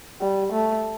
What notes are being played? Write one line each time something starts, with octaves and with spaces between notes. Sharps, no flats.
G3
A3